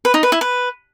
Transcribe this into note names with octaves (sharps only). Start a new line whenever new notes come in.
B4
D#4
B4
E4
B4